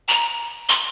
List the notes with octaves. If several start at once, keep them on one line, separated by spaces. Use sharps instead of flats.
A#5
C6